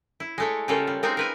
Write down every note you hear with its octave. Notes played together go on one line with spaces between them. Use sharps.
E4
G#3 A3 C#5
C#3 G3 A3 A#3 F4 A4
G3
G#3 A#3 C4 D#4 G#4
A#4 B4 G#5